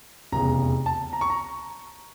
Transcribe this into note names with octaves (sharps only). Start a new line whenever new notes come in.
F1 E2 C#3 A#5
A5
A#5
C#6
A#5